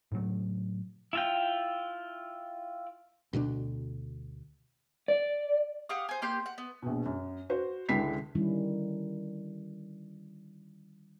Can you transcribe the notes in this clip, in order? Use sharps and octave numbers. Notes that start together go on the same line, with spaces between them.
A2 C#3 F#3 A3
E4 F4 G5
D2 B2 G#3 D4
D5
G4 F5 F#5 D#6
C5 G#5
A#3 G4 C6 G6
F#5
B3
A#1 B2
F#2
F#4 C5
C#2 D3 G#3 E4 B6 C7
D3 D#3 G3 C#4 E4